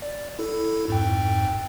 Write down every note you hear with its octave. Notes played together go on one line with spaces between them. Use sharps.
D5
E4 A4
F2 G#2 G5